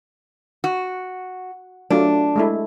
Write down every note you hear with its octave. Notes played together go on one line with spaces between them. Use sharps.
F#4
F#3 A3 D4 F4
G#3 A3 E4